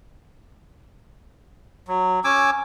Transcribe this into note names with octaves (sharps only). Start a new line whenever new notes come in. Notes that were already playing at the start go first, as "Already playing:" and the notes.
F#3
C#4 G#5 D6 E6